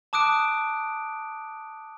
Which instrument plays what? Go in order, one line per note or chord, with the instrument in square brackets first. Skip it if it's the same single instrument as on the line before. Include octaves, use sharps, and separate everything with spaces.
[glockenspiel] A5 D6 D#6 F#6 D7